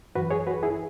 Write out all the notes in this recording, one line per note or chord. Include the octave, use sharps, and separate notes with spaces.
F#2 E3 F#4 B4
G#4 C#5
F#4 B4
E4 G#4